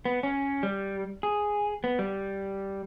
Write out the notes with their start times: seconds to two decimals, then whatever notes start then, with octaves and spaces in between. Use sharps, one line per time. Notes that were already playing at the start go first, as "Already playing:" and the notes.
0.05 B3
0.23 C#4
0.63 G3
1.23 G#4
1.84 B3
1.99 G3